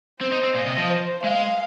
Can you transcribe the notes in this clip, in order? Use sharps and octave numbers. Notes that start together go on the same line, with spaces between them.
C4 C5
D#4
C4
A#2 D#5
C3
F3
C5
G#3 F5